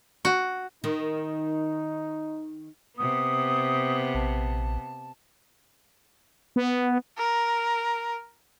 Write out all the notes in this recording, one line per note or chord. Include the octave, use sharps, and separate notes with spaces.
F#4
D#3 D#4
C3 B3 D#6
A#1 A5
B3
A#4